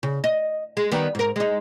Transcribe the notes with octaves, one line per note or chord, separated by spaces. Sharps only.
C#3
D#5
G#3
D#3 G3 B3
G#2 A#4
G#3 D#4